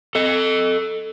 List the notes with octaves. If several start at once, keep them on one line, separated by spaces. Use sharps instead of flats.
A4 D#5